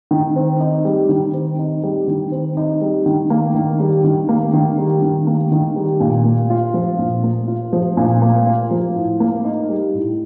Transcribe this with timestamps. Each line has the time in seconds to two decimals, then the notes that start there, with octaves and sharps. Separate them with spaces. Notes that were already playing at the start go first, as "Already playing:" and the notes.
0.11 D#3
0.36 C4
0.60 D#4
0.85 G3
1.09 D#3
1.34 C4
1.59 D#4
1.83 G3
2.08 D#3
2.32 C4
2.57 D#4
2.81 G3
3.06 D#3
3.30 A#3
3.55 D#3
3.80 G3
4.04 D#3
4.29 A#3
4.53 D#3
4.78 G3
5.02 D#3
5.27 A#3
5.52 D#3
5.76 G3
6.00 A#2
6.25 A#3
6.50 F4
6.74 F3
6.99 A#2
7.24 A#3
7.48 F4
7.73 F3
7.97 A#2
8.22 A#3
8.46 F4
8.71 F3
8.95 A2
9.20 A#3
9.45 D#4
9.69 G3
9.94 A2